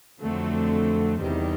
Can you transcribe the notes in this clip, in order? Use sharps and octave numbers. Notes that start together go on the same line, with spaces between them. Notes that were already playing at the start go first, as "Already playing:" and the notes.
F2 D3 F#3 A3 C4
E2 C3 D#3 G3